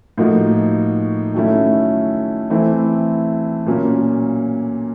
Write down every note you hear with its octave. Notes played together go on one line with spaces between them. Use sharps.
A2 F3 A#3 D#4 F#4
D#3 F#3 A3 C#4 E4
E3 A3 C4 E4
A#2 F#3 A#3 C#4